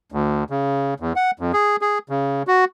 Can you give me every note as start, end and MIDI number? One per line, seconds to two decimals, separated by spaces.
0.12 0.44 38
0.50 0.94 49
1.00 1.13 40
1.16 1.31 78
1.39 1.52 41
1.53 1.76 68
1.81 1.98 68
2.09 2.43 49
2.47 2.65 66